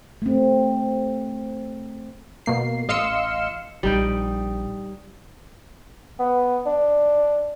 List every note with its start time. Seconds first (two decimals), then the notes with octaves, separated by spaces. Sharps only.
0.22 A3 C4
2.46 B2 A#3 C7
2.88 A1 D#5 F5 C6 E6 C#7
3.83 A#1 G3 D#4 G5
6.19 B3
6.66 D4